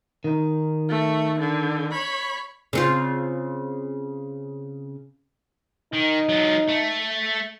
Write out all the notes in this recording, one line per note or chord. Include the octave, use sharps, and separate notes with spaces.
D#3 D#4
A3
D3
C#5 B5
C#3 C4 F4
D#3 D#4
F#3 F4
A3